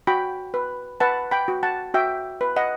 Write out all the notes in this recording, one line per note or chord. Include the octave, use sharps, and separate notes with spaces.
F#4 G5 B5
B4
B4 F#5 A5
G5 B5
F#4
F#5 A5
F#4 E5 G5
B4
D#5 F#5